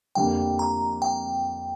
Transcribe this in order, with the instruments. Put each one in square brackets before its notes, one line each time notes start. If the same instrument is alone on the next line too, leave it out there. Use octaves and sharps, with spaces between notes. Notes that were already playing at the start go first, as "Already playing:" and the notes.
[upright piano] F2 D3 G3 A#3 [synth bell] G5
[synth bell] A#5
G5